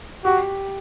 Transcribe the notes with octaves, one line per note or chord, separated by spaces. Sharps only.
F#4 G4